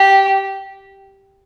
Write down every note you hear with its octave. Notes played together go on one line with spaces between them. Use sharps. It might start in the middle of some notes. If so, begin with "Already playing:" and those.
Already playing: G4